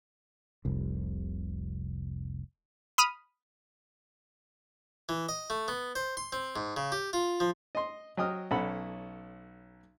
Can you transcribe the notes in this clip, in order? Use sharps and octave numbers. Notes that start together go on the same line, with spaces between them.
F1 C2
B5 D#6 F6
E3
D#5
A3
B3
C5
C6
C4
G#2
C#3
G4
F4
F3
D#5 C6
F#3 D#5 G5 D#6 F6
B1 C#4 A4 F#5 B5